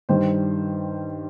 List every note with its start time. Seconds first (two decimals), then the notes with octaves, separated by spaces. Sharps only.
0.09 G2 D#3 G3 C5